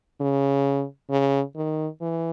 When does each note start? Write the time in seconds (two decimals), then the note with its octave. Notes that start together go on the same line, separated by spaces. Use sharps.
0.21 C#3
1.10 C#3
1.56 D#3
2.01 E3